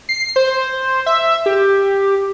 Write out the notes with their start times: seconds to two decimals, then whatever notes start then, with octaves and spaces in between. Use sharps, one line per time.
0.09 C7
0.36 C5
1.06 E5
1.46 G4